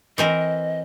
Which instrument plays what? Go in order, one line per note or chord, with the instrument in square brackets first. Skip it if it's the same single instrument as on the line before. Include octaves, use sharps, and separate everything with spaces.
[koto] E3 C4 A#4 [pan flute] D#5